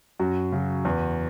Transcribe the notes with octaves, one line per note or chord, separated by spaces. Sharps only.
F#2 F#4
C#3 F#3
E2